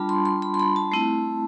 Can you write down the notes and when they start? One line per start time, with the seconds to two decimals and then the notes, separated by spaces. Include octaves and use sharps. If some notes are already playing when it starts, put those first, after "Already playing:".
Already playing: G3 D4 F4 A5 B5
0.09 C6
0.25 C6
0.42 B5
0.54 C6
0.60 B5
0.76 A5
0.92 A3 C4 E4